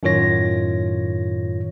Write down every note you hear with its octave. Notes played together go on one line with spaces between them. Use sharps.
F#2 A2 D#3 F4 C#5 A#6